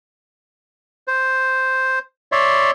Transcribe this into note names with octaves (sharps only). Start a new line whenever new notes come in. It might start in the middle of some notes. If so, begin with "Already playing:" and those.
C5
C#5 D5 E5 C6